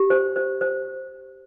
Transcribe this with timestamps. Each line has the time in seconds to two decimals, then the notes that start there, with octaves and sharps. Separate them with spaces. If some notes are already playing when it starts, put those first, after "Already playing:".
Already playing: G4
0.10 C5
0.36 C5
0.61 C5